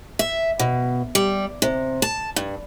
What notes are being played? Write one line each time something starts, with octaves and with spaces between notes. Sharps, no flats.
E5
B2
G3
C3
A5
G2